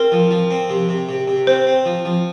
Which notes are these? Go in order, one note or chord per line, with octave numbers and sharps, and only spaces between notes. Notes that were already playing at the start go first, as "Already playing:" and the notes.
Already playing: C4 A#4
F3
F3
C4
C3
C3
C3
C3
C4 C5
C4
F3
F3